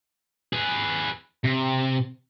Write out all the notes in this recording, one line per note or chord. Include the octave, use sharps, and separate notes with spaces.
G#4 B4
C3